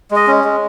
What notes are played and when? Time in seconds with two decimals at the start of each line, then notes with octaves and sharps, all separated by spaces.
0.11 G#3 D#5
0.27 C#4
0.44 G#3